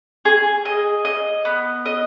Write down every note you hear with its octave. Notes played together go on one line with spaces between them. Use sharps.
G#4
D#5
D#5
B3
D#5